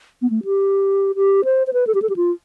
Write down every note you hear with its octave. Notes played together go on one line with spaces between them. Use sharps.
B3
A3
G4
G4
C5
C5
B4
A4
G4
A4
G4
F4